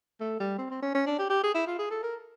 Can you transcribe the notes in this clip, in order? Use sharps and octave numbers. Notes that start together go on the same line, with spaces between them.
A3
G3
C4
C4
C#4
C#4
D4
G4
G4
G#4
E4
F4
G#4
A4
A#4